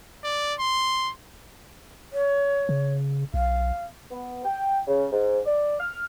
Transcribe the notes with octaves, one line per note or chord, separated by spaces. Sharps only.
D5
C6
C#5
C#3
B1 F5
B3
G5
C#3
G#2
D5
F6